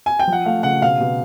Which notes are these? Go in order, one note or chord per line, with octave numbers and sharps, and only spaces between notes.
G#5
G5
F3
F#5
A3 F5
C#3 F#5
B2 F5
B2